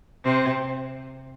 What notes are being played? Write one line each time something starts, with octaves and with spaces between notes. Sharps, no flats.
C3 C4